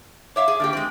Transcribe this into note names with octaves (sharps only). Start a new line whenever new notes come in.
C#5 E5 F5 D6
G#4
D3 A#3 G4
G#3 C4